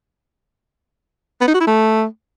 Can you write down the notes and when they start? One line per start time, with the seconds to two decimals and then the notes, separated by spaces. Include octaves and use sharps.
1.41 B3
1.48 D#4
1.54 F#4
1.61 E4
1.67 A3